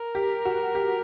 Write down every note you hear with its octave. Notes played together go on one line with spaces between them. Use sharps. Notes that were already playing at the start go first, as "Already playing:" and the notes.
Already playing: A#4
G4
F#4
G4